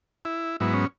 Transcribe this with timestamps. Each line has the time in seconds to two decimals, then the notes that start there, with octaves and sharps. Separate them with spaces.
0.25 E4
0.60 G#2 F#3 B3 E4
0.74 C#4